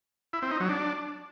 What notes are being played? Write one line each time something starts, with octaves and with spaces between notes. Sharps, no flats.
E4
C4
D#4
F#3
D4